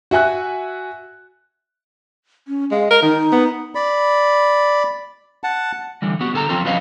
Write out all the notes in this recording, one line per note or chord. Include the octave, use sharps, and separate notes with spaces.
F#4 E5 G#5 F#6
C#4
G#3 F5
A#4 D#5
D#3 D#4
B3
D5 B5
F#5 A5
D3 E3 G3
B3 F#4 G4
D3 A4 G#5 A#5
F3 C4 F4 A4
F3 F#3 C#4 B4 D#5 F5